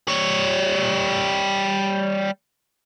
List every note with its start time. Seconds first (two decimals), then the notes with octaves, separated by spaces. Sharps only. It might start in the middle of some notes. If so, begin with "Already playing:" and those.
0.08 G3 C#5